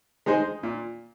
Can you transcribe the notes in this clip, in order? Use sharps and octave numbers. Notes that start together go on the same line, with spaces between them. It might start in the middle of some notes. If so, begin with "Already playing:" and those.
G#3 D#4 G#4 C5
A#2